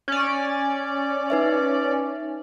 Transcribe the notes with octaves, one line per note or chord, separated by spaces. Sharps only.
C#4 D5
D#4 B4 E5